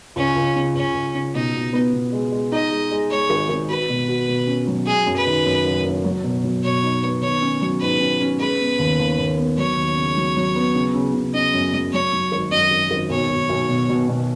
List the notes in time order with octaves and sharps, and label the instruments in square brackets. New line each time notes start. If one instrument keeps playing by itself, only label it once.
[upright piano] C#2 [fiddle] C#4
[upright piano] C#2
C#3
[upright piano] C#2 [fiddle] C#4
[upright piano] C#2
C#3
[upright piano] B2 [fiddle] D#4
[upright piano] B2
B3
B2
G#3
G#3
[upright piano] D#4 [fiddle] D#5
[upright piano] G#3
G#3
[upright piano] G#3 [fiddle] C#5
[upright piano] G#1
G#1
[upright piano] F#4 [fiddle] B4
[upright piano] B2
F#4
B2
C#4
F#3
[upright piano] G#3 [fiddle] G#4
[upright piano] F#2
[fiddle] B4
[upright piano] D#3
F#2
F#1
F#1
F#3
B2
F#3
[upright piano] B2 [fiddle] C#5
[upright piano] D#4
B3
[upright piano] D#3 [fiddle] C#5
[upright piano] C#4
F#3
[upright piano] G#2 [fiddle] B4
[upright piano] C#4
C#4
[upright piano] G#3 [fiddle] B4
[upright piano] B3
D#2
D#2
D#2
B3
[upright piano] F#3 [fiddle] C#5
[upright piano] D#2
C#3
F#3
F#3
B3
C#3
C#3
C#3
[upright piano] C#3 [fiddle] D#5
[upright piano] F#2
F#3
[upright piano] F#3 [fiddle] C#5
[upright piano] F#3
G#1
[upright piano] F#2 [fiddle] D#5
[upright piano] G#1
G#1
[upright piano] B1 [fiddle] C#5
[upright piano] B1
B1
B2
B2
B2